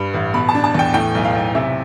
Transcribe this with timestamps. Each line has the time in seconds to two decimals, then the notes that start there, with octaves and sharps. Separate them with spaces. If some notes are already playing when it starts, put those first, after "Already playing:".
Already playing: G2 G3 B5
0.14 A1
0.34 B2 B5
0.49 A5
0.54 D4
0.64 A5
0.75 E2 G5
0.94 A2 G5
1.15 B1
1.25 F5
1.35 B1
1.55 C3 E5